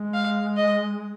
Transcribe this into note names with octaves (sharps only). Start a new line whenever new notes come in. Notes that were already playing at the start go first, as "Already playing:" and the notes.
Already playing: G#3
F5
D#5